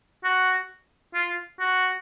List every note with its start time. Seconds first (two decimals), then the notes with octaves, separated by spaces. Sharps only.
0.24 F#4
1.14 F4
1.60 F#4